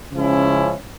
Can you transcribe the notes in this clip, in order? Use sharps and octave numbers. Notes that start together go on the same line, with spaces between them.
C#3 F3 G#3 C#4 E4